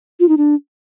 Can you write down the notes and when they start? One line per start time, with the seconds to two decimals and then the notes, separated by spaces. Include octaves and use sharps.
0.20 F4
0.29 D#4
0.37 D4